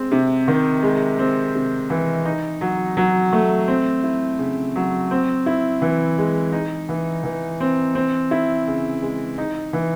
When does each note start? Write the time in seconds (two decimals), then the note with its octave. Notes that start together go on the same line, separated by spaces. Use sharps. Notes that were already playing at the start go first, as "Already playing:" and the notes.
Already playing: G#3 C4
0.11 C3
0.48 D#3
0.83 G#3
1.19 C4
1.55 C3
1.90 E3
2.25 D#4
2.61 F#3
2.97 F#3
3.32 A3
3.68 C4
4.04 E4
4.39 C#3
4.76 F#3
5.11 C4
5.46 E4
5.82 E3
6.18 G#3
6.52 D#4
6.89 E3
7.24 E3
7.60 C4
7.95 C4
8.31 E4
8.67 C#3
9.02 G#3
9.38 D#4
9.73 E3